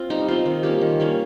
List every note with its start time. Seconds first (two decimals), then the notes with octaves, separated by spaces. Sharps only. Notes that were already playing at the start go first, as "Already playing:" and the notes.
Already playing: C4 F4
0.10 G3 D#4
0.28 C4 D#4 F4
0.46 D#3
0.63 G3 A#3 C#4 G4
0.81 D#3
1.00 G3 A#3 C#4